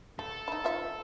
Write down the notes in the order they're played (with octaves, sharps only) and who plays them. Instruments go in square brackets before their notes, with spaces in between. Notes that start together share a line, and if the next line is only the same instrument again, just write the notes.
[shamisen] A3 [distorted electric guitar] A4
[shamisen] D#4 E4
F3 F4 E5